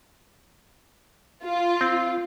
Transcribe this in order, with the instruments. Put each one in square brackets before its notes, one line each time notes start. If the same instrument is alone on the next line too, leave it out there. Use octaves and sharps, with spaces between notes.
[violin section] F4
[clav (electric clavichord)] C4